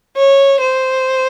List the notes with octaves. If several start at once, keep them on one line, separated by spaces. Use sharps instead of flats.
C#5
C5